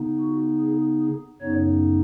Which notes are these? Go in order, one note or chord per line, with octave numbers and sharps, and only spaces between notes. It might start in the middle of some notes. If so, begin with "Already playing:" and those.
Already playing: C#3 B3 D#4
F#4
G#4
G#4
F#2 C#3 B3 D#4 C#5